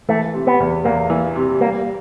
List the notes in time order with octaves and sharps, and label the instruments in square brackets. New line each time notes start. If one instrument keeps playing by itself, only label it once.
[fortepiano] E3 [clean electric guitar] A3
[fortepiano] C3
[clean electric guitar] B3
[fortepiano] E2
[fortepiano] E2 [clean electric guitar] A#3
[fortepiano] E3
C3
[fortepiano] G3 [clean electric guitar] A#3